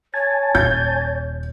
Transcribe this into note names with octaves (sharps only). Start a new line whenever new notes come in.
C#5 G#5 A5
D#1 G6